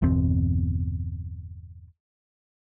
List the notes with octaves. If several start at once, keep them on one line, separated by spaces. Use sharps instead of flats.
G1 E2 B2 C4